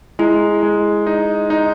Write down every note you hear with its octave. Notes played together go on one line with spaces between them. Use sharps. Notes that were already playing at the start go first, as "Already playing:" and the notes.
G#3 E4
G#3
D#4
D#4